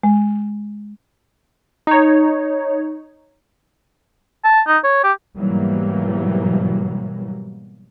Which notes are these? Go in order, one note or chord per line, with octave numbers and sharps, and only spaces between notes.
G#3
D#4 C#5
A5
D#4
C#5
G4
G#2 B2 E3 F#3 G3 A#3